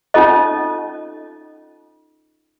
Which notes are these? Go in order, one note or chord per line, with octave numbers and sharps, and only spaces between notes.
C#4 D#4 F4 A4 D#5